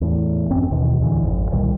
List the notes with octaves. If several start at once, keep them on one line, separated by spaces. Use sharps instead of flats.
E2 A2
A1 F#2 C4 C#4
D#2 B2 D#3 E3
D2 A2 D3 E3
G#1 F2
C2 A#2 D#3 G3